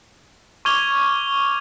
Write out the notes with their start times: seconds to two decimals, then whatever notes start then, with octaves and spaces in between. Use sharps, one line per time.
0.65 C#6 D6 F6 G#6 F7 G7